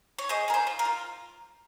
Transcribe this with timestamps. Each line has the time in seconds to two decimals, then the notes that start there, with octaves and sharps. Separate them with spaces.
0.18 C#5
0.29 G#4 C5 D#5
0.48 G#4 A#4
0.54 C5
0.67 F4
0.79 A#4
0.85 F4